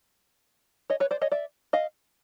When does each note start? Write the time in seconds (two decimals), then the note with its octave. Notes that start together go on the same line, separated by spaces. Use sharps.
0.90 C#5 D#5
1.00 B4 C#5
1.11 C5 D5
1.22 C#5 D#5
1.32 D5 E5
1.73 D#5 F5